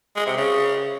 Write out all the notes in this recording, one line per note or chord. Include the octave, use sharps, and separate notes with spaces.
G#3
C3
C#3